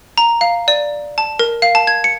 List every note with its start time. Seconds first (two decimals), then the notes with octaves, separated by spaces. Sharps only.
0.18 A#5
0.41 F5
0.68 D5
1.18 A5
1.39 A#4
1.62 F5
1.75 A5
1.87 G#6
2.04 C#7